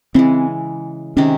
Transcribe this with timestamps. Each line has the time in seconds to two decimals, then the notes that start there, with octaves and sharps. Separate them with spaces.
0.14 C#3 E3 G#3 C4
1.17 C3 D#3 G#3 C#4